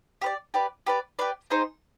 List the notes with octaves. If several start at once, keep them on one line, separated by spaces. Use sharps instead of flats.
G4 B4 D5
G4 B4 D5
G4 B4 D5
G4 B4 D5
C4 D#4 G#4 C5